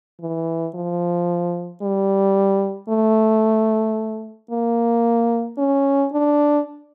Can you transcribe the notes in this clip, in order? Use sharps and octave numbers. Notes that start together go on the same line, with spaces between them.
E3
F3
G3
A3
A#3
C#4
D4